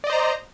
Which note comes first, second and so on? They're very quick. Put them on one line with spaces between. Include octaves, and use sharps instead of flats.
D5 D#5 C5 A#5